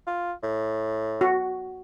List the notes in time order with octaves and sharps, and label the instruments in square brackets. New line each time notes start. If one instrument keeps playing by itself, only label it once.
[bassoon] F4
A2
[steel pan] F#4